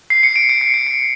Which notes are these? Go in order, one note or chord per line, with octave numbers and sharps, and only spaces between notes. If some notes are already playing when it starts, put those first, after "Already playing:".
C7
C#7
D7
C#7
C7
C#7
C7